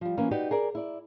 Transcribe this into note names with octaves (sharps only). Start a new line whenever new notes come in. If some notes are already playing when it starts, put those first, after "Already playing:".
F3 G3
E3 A#3 C#4 A#4 F5
D#4 F#4 G4 B4 D5
G#4 A#4 D5
E4 D5